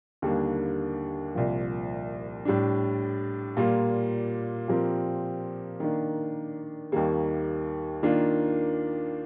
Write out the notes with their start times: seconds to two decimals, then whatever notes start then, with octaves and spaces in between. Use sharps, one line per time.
0.22 D#2 D3 G3 A#3 D4
1.35 C2 A#2 F3
2.45 A2 G3 D4
3.57 A#2 G3 A#3 F4
4.68 A#2 F3 C4 G4 A#4
5.80 D#3 A#3 D4
6.92 D#2 D#3 G3 A#3
8.03 D#3 A#3 D4 F4